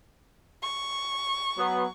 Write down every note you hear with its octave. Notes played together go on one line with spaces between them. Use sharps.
C#6
F#3 B3